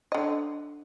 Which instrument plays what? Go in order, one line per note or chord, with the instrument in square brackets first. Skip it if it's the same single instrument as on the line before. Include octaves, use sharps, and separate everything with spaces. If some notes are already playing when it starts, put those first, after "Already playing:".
[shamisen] D3 D#5